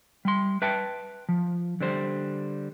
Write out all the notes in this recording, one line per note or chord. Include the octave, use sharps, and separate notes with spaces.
G3 C6
B4 E5 G5 A5
F3
D3 G3 C5